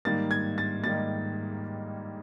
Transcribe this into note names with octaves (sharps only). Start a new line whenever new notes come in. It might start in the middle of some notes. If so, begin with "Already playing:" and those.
G#2 D#3 G3 A#3 D#4 A6
G#6
A6
G#2 D#3 G3 A#3 D#4 A6